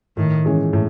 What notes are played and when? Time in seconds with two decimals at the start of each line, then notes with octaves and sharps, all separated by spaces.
0.17 A2 D#3
0.45 E3 G#3 C#4
0.73 A2